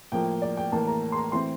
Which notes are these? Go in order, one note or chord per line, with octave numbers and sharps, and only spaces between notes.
A2 F3 A#3 G5
D5
G5
A2 E3 A#3 A5
A#5
C6
A#5
E3 A3 C4 C6